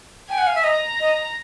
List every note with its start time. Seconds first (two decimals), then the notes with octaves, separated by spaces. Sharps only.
0.29 G5 G#5
0.38 F#5
0.47 F5
0.55 E5
0.64 D#5 A#5
1.00 D#5